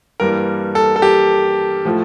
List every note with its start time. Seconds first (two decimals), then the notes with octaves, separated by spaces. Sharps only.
0.20 G2 E3 G3 A#3 A#4
0.75 A4
0.96 A4
1.02 G4
1.85 A2 F3 A3